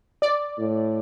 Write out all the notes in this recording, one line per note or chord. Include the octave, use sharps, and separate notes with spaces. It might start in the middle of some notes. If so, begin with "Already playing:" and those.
D5
A2